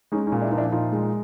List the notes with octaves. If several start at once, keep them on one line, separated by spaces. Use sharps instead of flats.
G#3 C#4 D#4
C#4 D#4
A#2
D4 E4
F3 D#4
D4 E4
A#2 D#4 F4
G#3